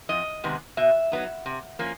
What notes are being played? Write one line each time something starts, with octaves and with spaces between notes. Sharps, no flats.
F2 D#5
C3 D#3 G#3 B3
B2 E5
F#3 B3 D#4
C3
F3 A#3 C#4